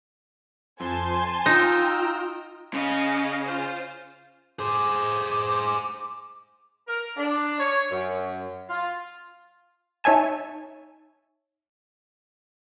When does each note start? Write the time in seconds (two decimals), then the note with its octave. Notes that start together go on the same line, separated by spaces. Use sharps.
0.80 F2 C5 G#5 A5 C6
1.46 D#4 F4 G5 A#5 E6
2.74 C#3 D#5 F5
3.45 F4 C5
4.59 G#4 C5 D6
6.88 A#4
7.17 D4
7.59 C#5
7.91 F#2
8.69 F4
10.04 D#4 C#5 E5 G#5 A5